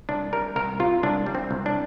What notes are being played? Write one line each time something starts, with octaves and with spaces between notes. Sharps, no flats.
C2 D4
G3 A#4
C2 A#4
C3 F4
C2 D4
G3
C4
C2
D4